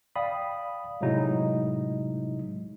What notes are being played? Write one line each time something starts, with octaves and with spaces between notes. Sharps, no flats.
D5 F5 G5 B5 D#6
A2 C3 F#3 G#3 D#4 E4